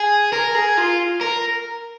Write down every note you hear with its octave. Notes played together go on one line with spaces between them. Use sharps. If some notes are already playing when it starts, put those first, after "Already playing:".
Already playing: G#4
A#4
G#4
F4
A#4